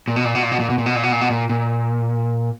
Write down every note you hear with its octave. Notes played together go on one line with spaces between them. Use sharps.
A#2
B2
A#2
B2
A#2
B2
A#2
B2
A#2
B2
A#2
B2
A#2
B2
A#2
A#2